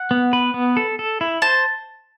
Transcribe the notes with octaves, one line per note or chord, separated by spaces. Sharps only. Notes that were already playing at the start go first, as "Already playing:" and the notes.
Already playing: F#5
B3
B4
B3
A4
A4
E4
C5 A5